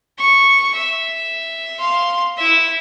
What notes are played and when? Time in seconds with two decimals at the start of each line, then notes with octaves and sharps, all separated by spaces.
0.19 C#6
0.75 E5
1.79 F5 C6
2.37 E4 E5